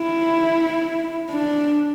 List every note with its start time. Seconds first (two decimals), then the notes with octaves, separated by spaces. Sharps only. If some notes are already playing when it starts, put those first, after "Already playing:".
Already playing: E4
1.30 D4